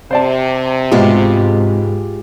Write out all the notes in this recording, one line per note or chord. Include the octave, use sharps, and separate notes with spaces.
C3 C5 D5 A5
G#2 B2 G#3 F4 G4